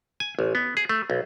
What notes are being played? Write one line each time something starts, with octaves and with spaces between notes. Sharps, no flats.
G#5
A1
B3
G#4
A3
B1